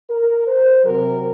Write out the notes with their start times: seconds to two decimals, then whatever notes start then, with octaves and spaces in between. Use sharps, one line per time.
0.10 A#4
0.47 C5
0.84 C3 F#3 A#4